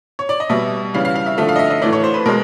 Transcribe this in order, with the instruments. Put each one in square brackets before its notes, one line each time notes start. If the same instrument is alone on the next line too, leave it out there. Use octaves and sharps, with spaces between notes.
[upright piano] C#5
D5
D#5
B2 G3 E5
C#3 E3 G3 F5
F5
F5
E5
D3 F3 A3 E5
F5
D#5
E5
D#5
A2 E3 A3 D5
C#5
C5
B4
B2 A#4
G#3